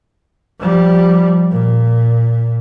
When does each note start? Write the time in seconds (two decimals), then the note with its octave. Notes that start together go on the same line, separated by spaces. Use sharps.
0.60 F3 G3
1.51 A#2